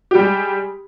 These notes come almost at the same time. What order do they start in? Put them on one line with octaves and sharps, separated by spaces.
G4 G3 G#3